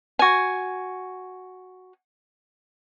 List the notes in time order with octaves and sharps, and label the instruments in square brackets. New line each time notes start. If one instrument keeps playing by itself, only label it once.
[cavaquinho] F#4 G#5